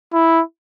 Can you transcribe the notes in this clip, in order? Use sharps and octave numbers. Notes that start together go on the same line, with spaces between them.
E4